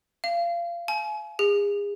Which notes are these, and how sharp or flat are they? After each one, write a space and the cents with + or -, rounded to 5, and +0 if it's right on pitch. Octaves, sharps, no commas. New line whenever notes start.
F5 -25
G#5 +40
G#4 -35